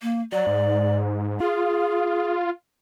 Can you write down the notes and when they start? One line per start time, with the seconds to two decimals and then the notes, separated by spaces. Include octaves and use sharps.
0.02 A#3
0.32 F#3 D5
0.47 G#2
1.40 F4 G#4